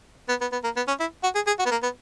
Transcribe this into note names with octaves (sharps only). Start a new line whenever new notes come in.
B3
B3
B3
A#3
B3
C#4
E4
F#4
G#4
G#4
F#4
B3
A#3
B3